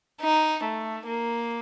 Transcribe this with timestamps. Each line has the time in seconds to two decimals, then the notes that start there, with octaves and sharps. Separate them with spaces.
0.22 D#4
0.63 A3
1.06 A#3